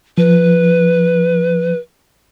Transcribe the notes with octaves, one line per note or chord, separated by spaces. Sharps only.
F3 B4